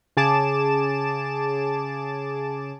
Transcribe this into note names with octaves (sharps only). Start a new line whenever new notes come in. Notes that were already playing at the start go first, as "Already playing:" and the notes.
C#3 G#4 A5 D6 E7